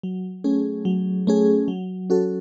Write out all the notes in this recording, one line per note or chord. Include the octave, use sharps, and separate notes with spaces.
F#3
A3 C#4 G#4
F#3
A3 C#4 G#4
F#3
C#4 F#4 A4